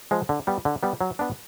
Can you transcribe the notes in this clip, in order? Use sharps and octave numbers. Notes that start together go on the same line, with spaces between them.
F3 G#3
D3
G3 B3
D3
G3 B3
F#3
B3 D4